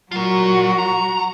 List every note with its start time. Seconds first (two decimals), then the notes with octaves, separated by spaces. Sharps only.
0.11 F#3 F4 F#4 A#4
0.78 A#5